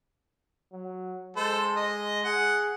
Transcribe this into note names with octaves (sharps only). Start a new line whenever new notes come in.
F#3
G#3 A4 C5
D#5
G#4 F#5